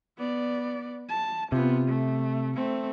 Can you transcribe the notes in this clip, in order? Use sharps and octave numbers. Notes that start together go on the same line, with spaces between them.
B3 D5
A5
C3 B3 F4
A3
A3 C4